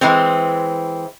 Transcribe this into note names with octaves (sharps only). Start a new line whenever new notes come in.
E3 G#3 C4